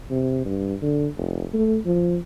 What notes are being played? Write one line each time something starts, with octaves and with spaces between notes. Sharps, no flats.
C3
G2
D3
F1
A3
F3